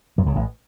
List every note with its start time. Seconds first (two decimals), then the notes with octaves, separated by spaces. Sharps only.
0.18 F#2 F#3
0.26 C#2 C#3
0.36 A1 A2